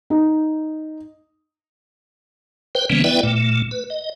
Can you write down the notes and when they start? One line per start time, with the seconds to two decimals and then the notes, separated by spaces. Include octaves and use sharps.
0.10 D#4
2.75 B4 C5 G5
2.90 C#3 E3 G3 A#3 B3 C#4
3.04 B3 E4 B4 D5 E5 G5
3.23 A#2 A3
3.71 B4
3.90 D#5